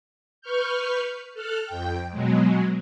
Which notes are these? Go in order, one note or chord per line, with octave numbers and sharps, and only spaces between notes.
B4 C#6 F6 G6
A4 F6 F#6
F2 G5
B2 F#3 G#3